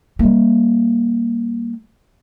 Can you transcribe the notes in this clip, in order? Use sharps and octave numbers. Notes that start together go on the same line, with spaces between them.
G3 A#3